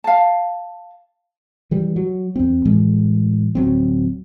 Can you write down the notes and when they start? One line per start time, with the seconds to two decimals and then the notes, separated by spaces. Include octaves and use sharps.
0.04 F5 A5
1.71 E3 G3
1.96 F#3
2.36 E2 C4
2.65 A2 E3 G#3
3.55 D1 F#3 C4